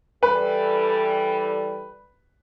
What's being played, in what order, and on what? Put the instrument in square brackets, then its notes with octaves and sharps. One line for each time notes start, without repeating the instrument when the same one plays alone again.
[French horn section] E3 G3 A4 [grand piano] B4